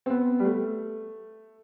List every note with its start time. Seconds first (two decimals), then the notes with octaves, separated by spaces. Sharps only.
0.06 C4
0.10 B3
0.39 G3
0.45 A3